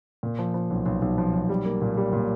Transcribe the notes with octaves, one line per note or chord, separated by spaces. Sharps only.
A#2
F3
F3
B1
B1
B1
F3
B1
G3
A#3
A#2
G3
A#2